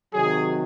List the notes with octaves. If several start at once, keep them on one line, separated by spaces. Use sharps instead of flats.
C3 D#3 F#3 G#4